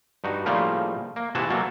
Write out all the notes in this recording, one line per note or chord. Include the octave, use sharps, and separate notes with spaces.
G2 D#4 F#4
A2 C#3 F3 G3 A#3 D#4
A#3
C3 E3 E4 F#4 G#4 A5
B2 F#3 A#3 A4